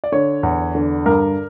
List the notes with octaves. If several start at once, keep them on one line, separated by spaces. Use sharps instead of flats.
D5
D3 C#5
E2
D3
G2 A#4